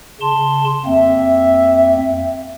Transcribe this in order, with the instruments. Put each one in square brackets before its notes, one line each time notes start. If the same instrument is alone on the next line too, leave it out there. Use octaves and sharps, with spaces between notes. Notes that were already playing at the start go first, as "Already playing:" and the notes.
[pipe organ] C#3 A5 C6
[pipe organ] F2 A#3 C4 [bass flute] E5